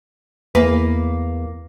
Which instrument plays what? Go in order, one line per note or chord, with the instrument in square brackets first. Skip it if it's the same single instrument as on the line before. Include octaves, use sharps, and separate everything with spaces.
[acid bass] E2 [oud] A#3 B4